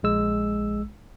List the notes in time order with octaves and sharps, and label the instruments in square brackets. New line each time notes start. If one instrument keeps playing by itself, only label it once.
[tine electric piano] A#1 G#3 E6